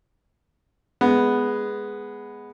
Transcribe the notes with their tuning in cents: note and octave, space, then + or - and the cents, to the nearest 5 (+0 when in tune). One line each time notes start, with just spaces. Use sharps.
G#3 +0 B3 +0